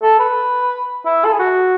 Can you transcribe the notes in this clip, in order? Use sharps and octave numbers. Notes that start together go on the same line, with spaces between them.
A4
B4
E4
A4
G#4
F#4